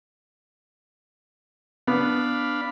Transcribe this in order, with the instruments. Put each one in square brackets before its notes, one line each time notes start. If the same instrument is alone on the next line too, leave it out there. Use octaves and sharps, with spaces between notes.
[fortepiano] B3 [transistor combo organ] D4 F5 B5